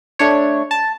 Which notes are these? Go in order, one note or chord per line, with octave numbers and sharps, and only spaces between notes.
A3 D4 C#5
A5